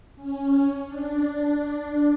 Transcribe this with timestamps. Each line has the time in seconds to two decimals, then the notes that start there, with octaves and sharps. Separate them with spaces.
0.16 C#4
0.86 D4